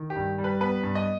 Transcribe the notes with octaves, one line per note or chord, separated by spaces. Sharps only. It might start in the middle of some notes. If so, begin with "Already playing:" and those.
Already playing: D#3
G4
G2
G3
B4
B3 B4
G2
D#5